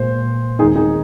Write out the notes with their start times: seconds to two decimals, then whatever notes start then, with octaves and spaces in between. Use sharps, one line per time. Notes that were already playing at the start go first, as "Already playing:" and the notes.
Already playing: A#2 G#3 C5
0.59 D#2 D#3 G#3 D#4 G#4
0.75 D#4 G#4